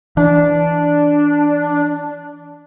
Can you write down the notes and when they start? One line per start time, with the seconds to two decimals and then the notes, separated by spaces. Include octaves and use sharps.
0.17 E3 D4